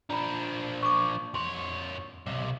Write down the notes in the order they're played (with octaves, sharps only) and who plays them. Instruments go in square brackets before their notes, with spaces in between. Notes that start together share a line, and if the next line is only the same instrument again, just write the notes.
[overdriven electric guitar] F3 D4 [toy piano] A#5 B5
[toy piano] C#6 D6
[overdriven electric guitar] F2 C#5 [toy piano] C6
[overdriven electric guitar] B1 C3